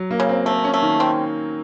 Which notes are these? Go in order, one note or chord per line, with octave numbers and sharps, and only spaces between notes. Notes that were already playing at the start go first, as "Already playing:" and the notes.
Already playing: F#3
A#3
C#3
C4
A3 C4
C#4
A3
D#3
C4